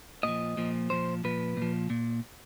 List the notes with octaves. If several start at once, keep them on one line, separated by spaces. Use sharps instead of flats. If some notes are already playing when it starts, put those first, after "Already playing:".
A#2 F3 D#5
A#2 F3
A#2 F3 C5
A#2 F3 B4
A#2
F3
A#2